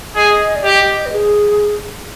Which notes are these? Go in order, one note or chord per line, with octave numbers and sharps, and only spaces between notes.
G#4 D#5
D5
G4 D#5
B4
G#4